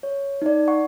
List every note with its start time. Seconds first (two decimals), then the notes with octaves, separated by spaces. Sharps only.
0.03 C#5
0.42 D#4 D5
0.68 F#5 C#6